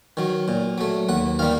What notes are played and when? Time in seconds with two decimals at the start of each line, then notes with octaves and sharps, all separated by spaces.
0.17 D#3 F#3
0.48 A#2
0.78 F#3 A3
1.09 D#2 F#5
1.39 D#3 G3 A#3 F5